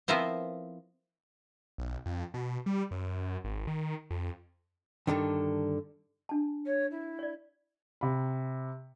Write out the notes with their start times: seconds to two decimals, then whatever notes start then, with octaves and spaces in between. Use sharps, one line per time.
0.08 F3 B3 C4 E4 A#4 C5
1.78 B1
2.06 F2
2.34 B2
2.66 G3
2.91 F#2
3.44 G#1
3.67 D#3
4.11 F2
5.07 G2 A#2 D3 D#3
6.29 D4 A5
6.66 C#5
6.90 E4
7.19 C#5 D5
8.01 C3 B5